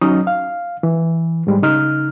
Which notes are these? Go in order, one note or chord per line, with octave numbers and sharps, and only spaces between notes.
F#3 C#4 D#4 D#5
F5
E3
G#2 G3 G#3
C#3 D#4 F6